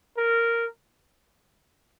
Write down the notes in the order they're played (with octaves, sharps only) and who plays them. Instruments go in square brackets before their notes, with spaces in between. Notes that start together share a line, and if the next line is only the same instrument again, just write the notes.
[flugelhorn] A#4